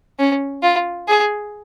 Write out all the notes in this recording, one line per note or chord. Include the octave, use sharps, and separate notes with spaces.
C#4
F4
G#4